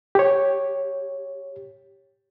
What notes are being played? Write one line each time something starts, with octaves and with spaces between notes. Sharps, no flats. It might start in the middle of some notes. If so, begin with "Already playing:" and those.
G4 C#5